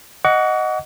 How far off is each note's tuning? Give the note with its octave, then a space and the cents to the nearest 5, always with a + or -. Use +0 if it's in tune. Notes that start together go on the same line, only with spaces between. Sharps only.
D#5 +0 F#5 +0 C#6 +45